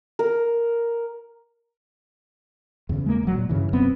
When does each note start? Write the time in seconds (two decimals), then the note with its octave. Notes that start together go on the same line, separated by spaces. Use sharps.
0.19 A#4
2.89 E2 C#3
3.06 G#3 A#3
3.23 D#1 F#3
3.34 A#2
3.49 G2 C#3 E3
3.73 E1 F#2 B3 C4